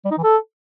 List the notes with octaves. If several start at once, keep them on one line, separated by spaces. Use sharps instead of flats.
G3
D#4
E3
A4